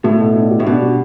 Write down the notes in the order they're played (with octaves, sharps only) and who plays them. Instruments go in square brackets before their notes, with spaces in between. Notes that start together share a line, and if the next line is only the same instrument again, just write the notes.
[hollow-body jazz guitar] A2 [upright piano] A3
[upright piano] B2
D4
G4
[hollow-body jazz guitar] A2
[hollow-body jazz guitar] B2 [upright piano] D4
[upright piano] G3